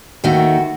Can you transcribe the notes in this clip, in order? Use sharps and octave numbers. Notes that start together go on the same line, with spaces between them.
D#2 D#3 A3 F#4